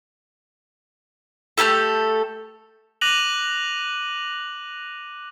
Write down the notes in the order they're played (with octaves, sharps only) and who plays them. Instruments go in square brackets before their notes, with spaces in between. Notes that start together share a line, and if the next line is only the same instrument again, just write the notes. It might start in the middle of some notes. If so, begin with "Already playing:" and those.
[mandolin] A3 B3 G4 A4
[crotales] D6 F#6 A#6 D#7 F7 F#7